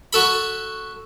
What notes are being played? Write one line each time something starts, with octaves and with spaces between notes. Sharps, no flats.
F#4 A4 B5